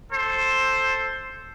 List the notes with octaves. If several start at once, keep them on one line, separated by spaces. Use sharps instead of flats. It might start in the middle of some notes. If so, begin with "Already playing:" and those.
A4 C5